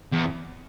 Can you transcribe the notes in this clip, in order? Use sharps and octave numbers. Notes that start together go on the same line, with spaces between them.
E2